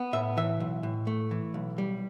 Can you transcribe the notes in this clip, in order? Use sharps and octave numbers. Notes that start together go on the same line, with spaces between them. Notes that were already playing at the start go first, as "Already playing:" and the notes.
Already playing: B3
A2 E5
E3 E5
B1
A2
A3
E3
B1
G3